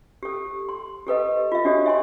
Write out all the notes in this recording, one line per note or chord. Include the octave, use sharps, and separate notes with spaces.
G4 A4
C6
G4 A4 B4 D#5
F4 E5
D4 F#4 G4 A4 C#5 D#5
E5 G#5 C6